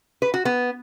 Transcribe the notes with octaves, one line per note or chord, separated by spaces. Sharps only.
B4
F#4
B3